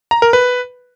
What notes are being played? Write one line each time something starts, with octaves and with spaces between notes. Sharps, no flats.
A#5
A#4
B4